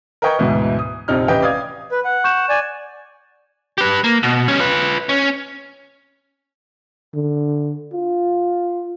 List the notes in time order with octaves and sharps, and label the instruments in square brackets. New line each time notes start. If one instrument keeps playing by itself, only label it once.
[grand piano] A#4 B4 D#5 G5 C#6 G#6
D2 G#2 B2 E3
D#6
A#1 F2 C3 D#4 F6
A1 E3 G4 B4 D#5 G5
D5 F5 D#6 G#6
[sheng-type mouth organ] B4
F#5
[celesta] C#6 G6 E7
[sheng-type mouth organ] D5 G#5
[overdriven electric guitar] G4 B4
A#3
B2
G3 C#4
F4 B4
C#4
[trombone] D3
F4